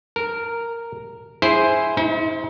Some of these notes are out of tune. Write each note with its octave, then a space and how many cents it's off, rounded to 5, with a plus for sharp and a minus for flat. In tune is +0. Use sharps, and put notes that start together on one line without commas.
A#4 -5 A5 +35
E4 +0 G#4 +0 C5 +0
D#4 +45 C5 -10